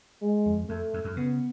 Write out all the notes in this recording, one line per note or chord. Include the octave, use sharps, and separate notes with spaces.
G#3
F2
F2 A3
F2
F#2
C#3 B3